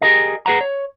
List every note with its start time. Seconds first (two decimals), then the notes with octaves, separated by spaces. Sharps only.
0.02 G4 G#4 A#4 D#5
0.46 G#4 B4 F#5 A#5
0.61 C#5